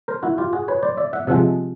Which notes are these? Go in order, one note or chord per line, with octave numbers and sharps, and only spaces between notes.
A#4 C5
E4 F#4
F4 G4
F#4 G#4
B4 C#5
C5 D5
D5 E5
E5 F#5
C3 F3 G#3 E5 F#5